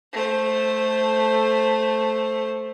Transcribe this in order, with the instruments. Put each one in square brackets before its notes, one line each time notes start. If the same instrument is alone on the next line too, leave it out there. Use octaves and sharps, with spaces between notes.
[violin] A3 C5